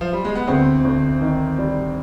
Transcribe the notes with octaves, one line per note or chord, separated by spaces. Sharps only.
F3
G3
G#3
B3
D2 C4
D2
D#3
G3